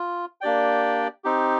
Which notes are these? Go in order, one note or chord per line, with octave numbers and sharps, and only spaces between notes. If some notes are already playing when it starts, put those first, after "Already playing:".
Already playing: F4
A#3 D4 G4 D5 G5
C4 D#4 G4